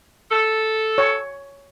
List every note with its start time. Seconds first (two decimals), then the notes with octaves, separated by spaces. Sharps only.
0.31 A4
0.98 C#5